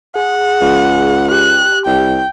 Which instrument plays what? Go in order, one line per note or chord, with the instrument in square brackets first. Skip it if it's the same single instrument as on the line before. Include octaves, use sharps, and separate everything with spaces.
[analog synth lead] G#4 [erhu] F#5
[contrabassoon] C#2
[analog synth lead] G4 [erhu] F#6
[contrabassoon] C2 [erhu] G5